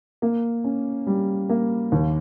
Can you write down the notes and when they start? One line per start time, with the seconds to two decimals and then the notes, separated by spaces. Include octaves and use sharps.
0.22 A#3
0.64 C#4
1.07 G3
1.49 A#3
1.92 D#2